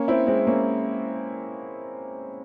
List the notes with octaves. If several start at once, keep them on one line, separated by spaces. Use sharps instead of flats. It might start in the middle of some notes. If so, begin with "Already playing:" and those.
Already playing: A#3 C#4
C4 E4
G#3 C4
A#3 C#4